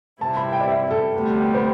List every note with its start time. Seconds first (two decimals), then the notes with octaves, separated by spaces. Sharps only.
0.21 C3 G3 C4 E4 A5
0.37 B5
0.53 G5
0.61 D5
0.68 E5
0.91 A4
1.14 D2 C3 G3 B3
1.54 C5